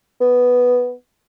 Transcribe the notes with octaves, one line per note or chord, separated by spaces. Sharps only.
B3